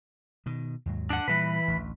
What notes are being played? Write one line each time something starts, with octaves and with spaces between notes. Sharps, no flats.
B2 D#3
D#2 G#2 F#3
D4 F#5
A#2 E3 G3 B4
A1 D2